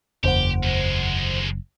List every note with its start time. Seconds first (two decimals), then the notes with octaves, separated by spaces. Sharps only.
0.24 F#1 E2 G4 C5 F#5
0.63 D#2 G#3